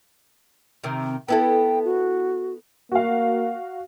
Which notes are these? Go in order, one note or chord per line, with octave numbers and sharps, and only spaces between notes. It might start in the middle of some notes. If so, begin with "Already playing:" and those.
C3 D#3
B3 E4 A4 G5
F#4
A#3 F#4 F5